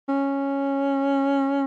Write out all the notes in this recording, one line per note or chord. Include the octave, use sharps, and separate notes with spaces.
C#4